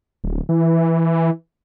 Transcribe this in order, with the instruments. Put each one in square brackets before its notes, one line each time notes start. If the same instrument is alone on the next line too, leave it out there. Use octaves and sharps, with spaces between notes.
[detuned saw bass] D1
E3